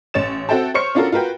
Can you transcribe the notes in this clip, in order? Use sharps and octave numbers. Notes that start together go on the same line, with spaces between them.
A1 C#5 A6 E7
C4 F#4 A4 E5 G5 A5
C5 C#5 C#6 F6 C#7
C#4 D4 F4 F#4 A4 A#4
F4 F#4 A#4 B4 G5